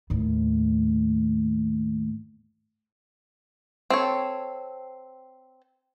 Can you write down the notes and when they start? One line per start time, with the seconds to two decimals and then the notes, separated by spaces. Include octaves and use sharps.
0.10 D#2 A2
3.90 C4 A4 C#5